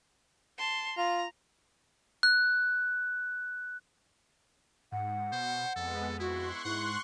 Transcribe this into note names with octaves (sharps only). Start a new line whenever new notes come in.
A5 C6
F4 A#5
F#6
G#2 F#5
B2 C5
F2 G#3 B3 A4
E4 F#4 C6 C#6 F#6
G#2 E4 F#5